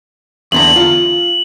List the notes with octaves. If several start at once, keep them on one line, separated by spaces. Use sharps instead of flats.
E2 D3 A#5 F#7
F4